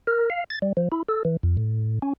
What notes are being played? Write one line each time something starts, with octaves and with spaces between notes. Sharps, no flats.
A#4
F5
A6
G3
F3
E4
A4
E3
F2
A2
C#4